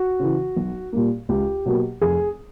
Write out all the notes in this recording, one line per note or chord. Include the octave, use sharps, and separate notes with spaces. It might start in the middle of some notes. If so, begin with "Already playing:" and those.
Already playing: F#4
C#3 E3
B1
A#2 G3 A#3
C#2 G4
B2 F#3 A#3
F1 G#4